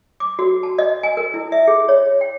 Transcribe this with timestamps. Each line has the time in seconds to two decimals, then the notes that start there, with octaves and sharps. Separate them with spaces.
0.20 D6
0.39 F#4
0.63 A5
0.78 D#5
1.03 G#5
1.17 A#4
1.34 E4
1.52 E5
1.68 G#4
1.89 C#5
2.21 G5